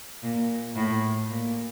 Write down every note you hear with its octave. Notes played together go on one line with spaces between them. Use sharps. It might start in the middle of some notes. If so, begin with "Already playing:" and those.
A#2
A2
A#2